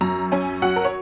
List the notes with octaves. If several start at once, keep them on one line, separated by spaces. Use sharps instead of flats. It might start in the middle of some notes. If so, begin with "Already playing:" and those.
F#2 A#5
C#4 G#5
F#3 F#5
A#4
C#5